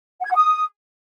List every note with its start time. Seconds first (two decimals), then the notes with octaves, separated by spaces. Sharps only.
0.20 F#5
0.25 G#6
0.30 F#5
0.36 D#6